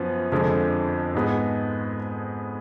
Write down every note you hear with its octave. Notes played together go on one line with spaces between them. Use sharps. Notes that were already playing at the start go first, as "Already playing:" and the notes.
Already playing: F#2 F3 B3
F2 D3 F3 G#3
G#2 G#3 B3